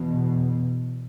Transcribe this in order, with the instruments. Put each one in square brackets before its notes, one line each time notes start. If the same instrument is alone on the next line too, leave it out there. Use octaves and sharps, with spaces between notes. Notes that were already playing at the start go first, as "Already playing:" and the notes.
Already playing: [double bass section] E2 B2